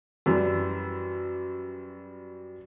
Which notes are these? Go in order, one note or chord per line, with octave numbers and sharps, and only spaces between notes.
F#2 E3 G3